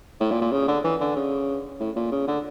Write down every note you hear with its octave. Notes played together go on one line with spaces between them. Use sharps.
A2
A#2
A#2
C#3
D3
E3
D3
C#3
A2
A#2
C#3
D3